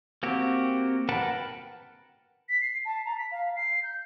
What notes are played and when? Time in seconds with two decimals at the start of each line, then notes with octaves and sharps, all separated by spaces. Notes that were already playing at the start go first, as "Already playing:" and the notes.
0.23 A#3 C4 F#4 G4
1.09 A#4 B4 F#5 G5 A5
2.49 B6
2.61 C7
2.85 A5
3.05 A#5
3.18 B6
3.32 F5
3.56 C7
3.83 G6